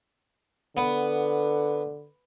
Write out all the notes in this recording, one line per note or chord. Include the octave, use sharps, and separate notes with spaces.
D3 B3